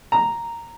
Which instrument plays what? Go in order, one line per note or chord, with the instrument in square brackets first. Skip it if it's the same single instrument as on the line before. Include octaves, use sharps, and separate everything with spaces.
[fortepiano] A#5